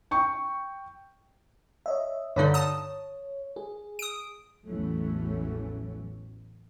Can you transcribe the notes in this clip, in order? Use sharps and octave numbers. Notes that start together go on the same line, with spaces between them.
G5 C#6
C#5 D#5 E5
G2 D3 D#4 C#5
A5 D#6
G#4
D#6 D7
A1 E2 E3 F#3 A3 C#4